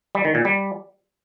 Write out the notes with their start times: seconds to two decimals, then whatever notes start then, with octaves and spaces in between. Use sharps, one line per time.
0.15 G3
0.25 D#3
0.35 A#2
0.45 G3